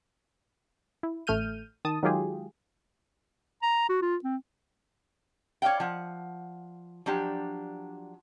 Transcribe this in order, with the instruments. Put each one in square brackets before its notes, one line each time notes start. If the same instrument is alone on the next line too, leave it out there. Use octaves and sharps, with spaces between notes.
[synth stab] E4
A1 A3 F6 G6 D#7
D#3 A5 D#6
D#3 F#3 G#3 F4 G4 G#4
[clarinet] A#5
F#4
F4
C4
[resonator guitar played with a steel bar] C#5 D5 E5 F5 G5
F3 F#5
F3 F#3 D4 G4